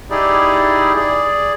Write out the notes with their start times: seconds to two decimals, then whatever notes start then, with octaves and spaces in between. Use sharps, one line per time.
0.11 D#4 E4 G4 G#4 D5
0.96 G#4 D5